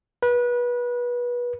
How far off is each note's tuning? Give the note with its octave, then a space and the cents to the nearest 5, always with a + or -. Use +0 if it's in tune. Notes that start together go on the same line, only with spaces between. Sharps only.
B4 -25